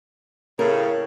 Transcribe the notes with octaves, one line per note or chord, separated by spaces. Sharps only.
A2 C#3 A#4